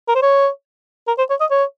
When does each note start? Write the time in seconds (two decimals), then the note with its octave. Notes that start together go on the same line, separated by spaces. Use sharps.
0.08 A#4
0.15 C5
0.22 C#5
1.07 A#4
1.18 C5
1.30 C#5
1.40 D#5
1.51 C#5